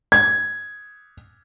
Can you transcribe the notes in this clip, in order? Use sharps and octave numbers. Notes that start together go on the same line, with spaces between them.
G#6